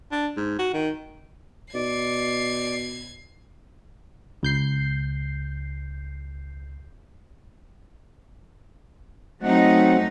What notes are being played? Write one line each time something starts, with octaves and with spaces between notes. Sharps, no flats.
D4
G#2
F#4
D#3
B2 D5 G#6 C7
C#2 G6 C7
F#3 A3 C4 D#4 F#5